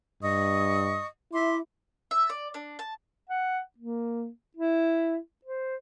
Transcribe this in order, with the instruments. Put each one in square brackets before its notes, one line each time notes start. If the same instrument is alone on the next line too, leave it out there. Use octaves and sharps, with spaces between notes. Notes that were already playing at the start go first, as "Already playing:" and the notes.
[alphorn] G2 [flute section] D#5 C#6 D#6
[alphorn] E4 [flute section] E5 C6 D6
[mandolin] E5
D5
D4
A5
[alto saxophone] F#5
A#3
E4
C5